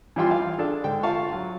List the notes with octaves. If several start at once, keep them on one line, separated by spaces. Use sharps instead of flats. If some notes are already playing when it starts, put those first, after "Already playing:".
E3 F3 G3 F4 G5 C6
F5
D4 G#4 A4
G#2 D3 G5
F4 F5 A5 C#6
F#3